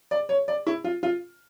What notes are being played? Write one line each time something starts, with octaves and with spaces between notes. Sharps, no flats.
D5
C#5
D5
E4
F4
F4